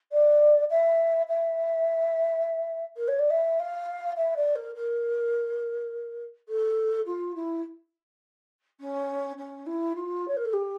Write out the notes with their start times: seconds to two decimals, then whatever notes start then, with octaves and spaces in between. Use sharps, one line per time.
0.12 D5
0.70 E5
1.27 E5
2.96 A#4
3.07 C#5
3.18 D5
3.30 E5
3.59 F5
4.16 E5
4.36 D5
4.55 A#4
4.74 A#4
6.48 A4
7.06 F4
7.34 E4
8.80 C#4
9.37 C#4
9.66 E4
9.95 F4
10.27 C#5
10.36 A#4
10.45 A4
10.53 G4